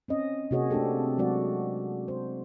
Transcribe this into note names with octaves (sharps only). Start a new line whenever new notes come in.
C4 C#4 D#5
C3 A#3 F#4 G#4 C#5 D#5
A3 C4 D4 G4 A4
F#3 G#3 F#4 D5
C5